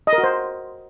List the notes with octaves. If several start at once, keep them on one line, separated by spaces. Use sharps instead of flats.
D#5
A#4
F#4
C5